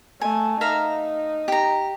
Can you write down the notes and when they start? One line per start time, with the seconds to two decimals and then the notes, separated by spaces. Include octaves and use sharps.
0.21 A3 G#5
0.61 D#4 E5 F5 A#5
1.48 G4 A#5